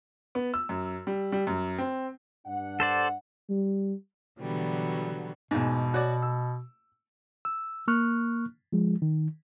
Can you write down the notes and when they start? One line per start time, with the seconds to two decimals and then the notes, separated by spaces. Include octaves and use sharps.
0.35 B3
0.54 E6
0.69 F#2
1.07 G3
1.32 G3
1.47 F#2
1.78 C4
2.46 G2 D4 F#5
2.80 A4 C5 D5
3.49 G3
4.40 B2 D3 E3 F#3 G3 B3
5.51 E2 G#2 B2
5.94 F#4 C#5 D5
6.22 E6
7.45 E6
7.88 A#3 C#6 F6 F#6
8.73 F3 G#3
9.02 D#3